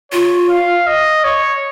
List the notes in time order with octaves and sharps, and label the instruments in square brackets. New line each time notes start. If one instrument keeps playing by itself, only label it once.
[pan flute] F4 [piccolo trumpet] C#5
[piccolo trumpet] F5
D#5
C#5